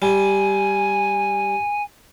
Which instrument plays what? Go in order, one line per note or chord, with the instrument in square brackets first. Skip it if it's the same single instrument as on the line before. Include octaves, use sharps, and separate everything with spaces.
[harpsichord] G3 [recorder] G#5